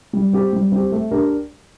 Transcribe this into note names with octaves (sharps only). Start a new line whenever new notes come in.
G3
C4 G4
G3
C4 G4
A3
D4 G4 A#4